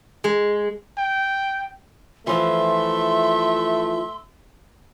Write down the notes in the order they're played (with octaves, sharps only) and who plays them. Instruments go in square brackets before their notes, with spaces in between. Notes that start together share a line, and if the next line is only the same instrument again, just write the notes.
[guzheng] G#3
[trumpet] G5
[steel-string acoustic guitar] E3 F3 [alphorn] A3 [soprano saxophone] E5 [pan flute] C6